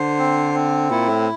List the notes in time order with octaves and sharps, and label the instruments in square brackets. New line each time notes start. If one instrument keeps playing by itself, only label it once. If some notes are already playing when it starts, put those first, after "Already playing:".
Already playing: [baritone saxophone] D3 [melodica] C5
[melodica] C4
C4
[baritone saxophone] A#2 [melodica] E4
[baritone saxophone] A2